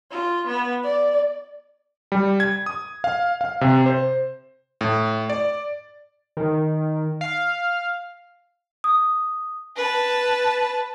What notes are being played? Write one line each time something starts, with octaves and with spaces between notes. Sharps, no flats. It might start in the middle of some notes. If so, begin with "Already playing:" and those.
F4
B3
D5
G3
G#6
D#6
F5
F5
C3
C5
A2
D5
D#3
F5
D#6
B4 A5